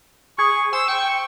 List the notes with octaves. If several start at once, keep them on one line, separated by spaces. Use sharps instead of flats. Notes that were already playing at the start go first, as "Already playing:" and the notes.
G#4 C#6
C5 E6
G5 C#6